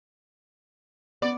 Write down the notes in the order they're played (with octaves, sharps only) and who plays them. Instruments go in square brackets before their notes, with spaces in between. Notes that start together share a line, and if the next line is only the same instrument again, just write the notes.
[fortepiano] B3 [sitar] D5